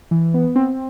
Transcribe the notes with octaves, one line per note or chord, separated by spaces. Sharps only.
E3
B3
C4